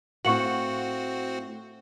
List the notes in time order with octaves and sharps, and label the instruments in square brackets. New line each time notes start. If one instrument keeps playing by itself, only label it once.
[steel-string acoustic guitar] A2 F5 F#5 [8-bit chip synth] C4 F#4 [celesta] C#6 C#7 F#7